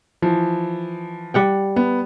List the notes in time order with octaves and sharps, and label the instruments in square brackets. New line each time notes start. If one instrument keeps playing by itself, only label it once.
[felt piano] E3 F3
[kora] G3 F#5 G5
[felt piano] B3